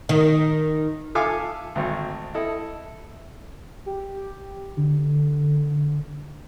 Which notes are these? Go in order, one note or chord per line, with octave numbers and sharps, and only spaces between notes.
D#3
F4 A4 E5 F5 G#5 D6
G#1 D2
E4 A4 D#5
G4
D3